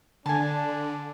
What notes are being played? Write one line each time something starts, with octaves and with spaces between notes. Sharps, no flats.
D3 D4 G#5 A5